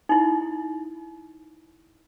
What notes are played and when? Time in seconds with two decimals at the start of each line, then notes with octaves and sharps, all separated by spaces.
0.09 D#4 E4